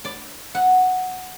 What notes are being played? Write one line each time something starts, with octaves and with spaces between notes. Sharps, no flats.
D5
F#5